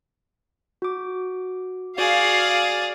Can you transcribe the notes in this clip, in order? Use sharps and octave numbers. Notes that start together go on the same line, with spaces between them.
F#4 D6
F#4 G#4 D5 F5